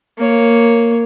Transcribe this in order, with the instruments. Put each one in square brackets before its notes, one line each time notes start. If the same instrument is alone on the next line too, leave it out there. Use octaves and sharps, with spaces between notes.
[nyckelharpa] A#3 C#5